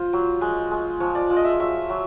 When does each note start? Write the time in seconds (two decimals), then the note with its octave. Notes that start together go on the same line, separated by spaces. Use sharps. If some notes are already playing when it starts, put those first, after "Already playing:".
Already playing: F4 C5
0.13 F#3
0.41 G#3
0.71 G#3
1.00 F3 C#5
1.15 D5
1.30 F3
1.36 D#5
1.45 E5
1.60 F#3 E5
1.90 F#3